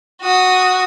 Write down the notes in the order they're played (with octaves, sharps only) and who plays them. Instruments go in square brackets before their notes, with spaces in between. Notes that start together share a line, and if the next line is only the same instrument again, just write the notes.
[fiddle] F#4 D#6